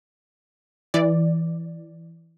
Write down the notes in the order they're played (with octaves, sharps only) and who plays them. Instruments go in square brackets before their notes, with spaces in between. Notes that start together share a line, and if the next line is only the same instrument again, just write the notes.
[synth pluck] E3 D5